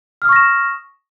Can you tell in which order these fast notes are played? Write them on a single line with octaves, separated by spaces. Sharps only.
F6 D#6 C#6 A#6 E7